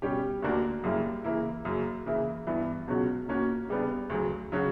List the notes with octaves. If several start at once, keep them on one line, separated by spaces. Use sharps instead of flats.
B2 G3 C#4 G4
D2 D3 A#3 D4 F#4
F#2 C#3 G3 A#3 E4
C#3 E3 A#3 E4
F#2 C#3 F#3 A#3
C#3 E3 A#3 E4
G2 E3 B3 E4
C#2 B2 F#3 C#4 F#4
A#2 A#3 C#4 F#4
C#3 G3 B3 D4
D2 C#3 F#3
C#3 F#3 C#4 F#4